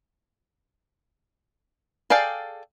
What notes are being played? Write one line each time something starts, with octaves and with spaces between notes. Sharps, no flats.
G#4 A4 D5 F5 G5